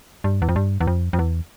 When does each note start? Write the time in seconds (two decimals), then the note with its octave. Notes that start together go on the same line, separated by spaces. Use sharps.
0.24 G2
0.42 E2
0.49 F2
0.56 G2
0.80 E2
0.87 F2
1.13 F2
1.19 E2